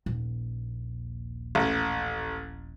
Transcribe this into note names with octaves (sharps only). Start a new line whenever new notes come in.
D#1 A#1
A1